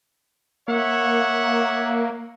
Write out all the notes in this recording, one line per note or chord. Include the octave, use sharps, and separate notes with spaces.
A#3 C#5 E5 F#5